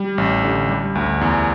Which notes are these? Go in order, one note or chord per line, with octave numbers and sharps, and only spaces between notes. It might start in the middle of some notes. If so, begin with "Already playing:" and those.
Already playing: G3
A1
D3
G3
D2
E2